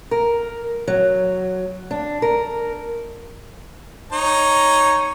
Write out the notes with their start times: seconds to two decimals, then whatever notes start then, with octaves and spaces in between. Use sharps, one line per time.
0.11 A#4
0.88 F#3
1.91 D4
2.22 A#4
4.12 D#4 C#5 A#5